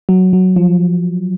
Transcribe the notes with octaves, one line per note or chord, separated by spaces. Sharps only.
F#3
F#3
F3